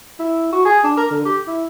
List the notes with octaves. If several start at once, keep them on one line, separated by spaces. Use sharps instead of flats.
E4
F#4
G#4
D4
A#4
D3
G4
E4